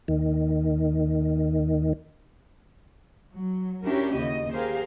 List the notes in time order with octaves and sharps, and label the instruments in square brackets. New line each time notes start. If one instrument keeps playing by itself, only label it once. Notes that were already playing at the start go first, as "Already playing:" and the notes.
[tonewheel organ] D#2 D#3
[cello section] F#3
C#4 D4 E4 F#4 G4 A#4
D#2 C#3 D#5
G4 G#4 A#4 C5 F5